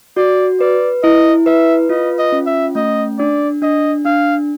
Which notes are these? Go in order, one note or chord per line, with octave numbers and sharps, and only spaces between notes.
F#4 D5
B4 D5
E4 D#5
B4 E5
F4 D#5
D#5
C#4
E5
A3 D#5
D4 D5
D4 D#5
D4 F5